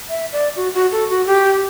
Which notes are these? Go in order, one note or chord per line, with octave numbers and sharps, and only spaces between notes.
E5
D5
F#4
F#4
A4
F#4
G4